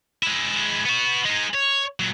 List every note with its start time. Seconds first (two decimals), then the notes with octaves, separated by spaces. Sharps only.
0.23 G#3 E4
0.85 B3 F#4
1.26 G#3 D#4
1.55 C#5
2.00 A#2 F#3